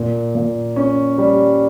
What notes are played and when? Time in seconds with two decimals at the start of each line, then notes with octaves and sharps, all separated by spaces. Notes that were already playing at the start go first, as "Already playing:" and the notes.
Already playing: A#2
0.35 A#2
0.76 C#4
1.18 G3